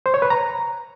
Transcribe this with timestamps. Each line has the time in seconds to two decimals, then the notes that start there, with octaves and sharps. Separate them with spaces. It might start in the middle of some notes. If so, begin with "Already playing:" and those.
0.06 C5
0.14 C#5
0.22 B4
0.30 A#5